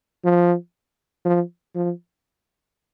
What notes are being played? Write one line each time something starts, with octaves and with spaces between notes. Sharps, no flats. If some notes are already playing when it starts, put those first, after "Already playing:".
F3
F3
F3